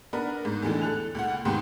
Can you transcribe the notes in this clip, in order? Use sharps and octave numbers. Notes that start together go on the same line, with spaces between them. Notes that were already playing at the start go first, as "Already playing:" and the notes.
B3 D4 A#4 B5
G#2
E2 A2 D3 E3 G#3
A4 F#6 F7
C#2 A#2 F#5
D#2 G#2 C3 B3 G5 C6